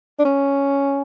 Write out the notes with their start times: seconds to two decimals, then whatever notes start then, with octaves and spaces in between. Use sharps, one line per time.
0.19 D4
0.25 C#4